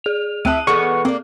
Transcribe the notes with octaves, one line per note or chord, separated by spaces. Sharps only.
G#4 F7
D2 C4 E4 E5 A5 F#6 D#7
E3 B3 G#4 A4 B5 C#6
A#3 C4 D4